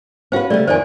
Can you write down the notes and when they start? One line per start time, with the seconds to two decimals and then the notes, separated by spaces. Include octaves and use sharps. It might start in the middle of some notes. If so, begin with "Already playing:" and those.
0.32 C#4 F#4 B4 C5 F5
0.50 C#3 G3 A3 D5
0.67 F2 D#3 E3 C5 D5 G#5